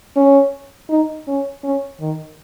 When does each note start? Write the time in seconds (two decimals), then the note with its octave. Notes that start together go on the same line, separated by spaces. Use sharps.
0.16 C#4
0.89 D#4
1.27 C#4
1.63 C#4
2.00 D#3